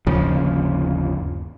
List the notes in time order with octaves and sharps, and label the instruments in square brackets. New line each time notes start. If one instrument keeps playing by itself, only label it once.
[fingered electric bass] G1 D#2 C#3 F3